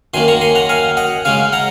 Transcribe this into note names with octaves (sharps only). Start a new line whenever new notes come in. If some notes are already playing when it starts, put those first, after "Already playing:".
F#2 D#3 A#3 G#5 C6
A#5 C#6
G#5 C6
F#5 A#5
F5 G#5
D#5 F#5
C#3 G#3 C#4 F5 G#5
F#5 A#5